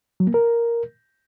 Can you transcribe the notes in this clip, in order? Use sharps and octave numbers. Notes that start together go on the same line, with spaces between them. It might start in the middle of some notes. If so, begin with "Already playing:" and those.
F#3
A#3
A#4